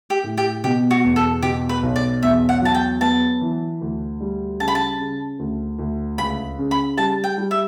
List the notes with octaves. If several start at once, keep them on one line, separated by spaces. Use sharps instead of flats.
G4
A2
G4
B2 G4
F#4
E2
A4
B2 G4
B4
B1
D5
E2 E5
F#5
F#3 A5
G5
B3 A5
E3
D2
G3
C#3 A5
B5
A5
C#3
D2
D2
C#2 B5
C#3
B5
G3 A5
G5
G3
E5